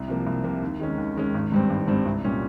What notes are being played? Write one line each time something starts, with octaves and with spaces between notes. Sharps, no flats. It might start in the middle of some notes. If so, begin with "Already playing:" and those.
Already playing: C2
C3 F3 A#3
C2
C3 F3 A#3
D#2
D#3 G#3 C#4
D#2
D#3 G#3 C#4
G#1
G2 G3 C4
G#1
G2 G3 C4
C2
A#2 G3 C#4